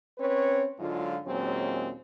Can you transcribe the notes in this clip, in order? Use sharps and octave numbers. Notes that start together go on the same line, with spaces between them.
C4 C#4 B4 C#5
G#2 D3 F#3 G#3 F4
D#2 A#2 F#3 G#3 C4 C#4